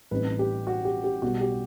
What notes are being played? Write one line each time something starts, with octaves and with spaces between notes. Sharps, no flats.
A1 A2 G3 C4 D#4 B4
G4
F#4
G4
G4
B1 B2 G3 F#4
G4